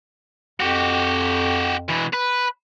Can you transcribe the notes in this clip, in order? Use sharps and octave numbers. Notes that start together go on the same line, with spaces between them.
F2 F#4 G4
B2 E3
B4